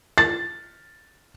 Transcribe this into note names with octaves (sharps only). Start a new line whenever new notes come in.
A6